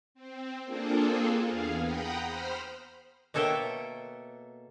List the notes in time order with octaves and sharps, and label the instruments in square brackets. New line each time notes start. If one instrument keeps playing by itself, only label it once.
[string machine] C4
A#3 C4 D4 F4 G#4 A4
E2 B3 G#4 F5
F#5 G5 A#5 B5 D#6
C5 B5 F6
[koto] B2 A#3 A4 C#5 E5 G5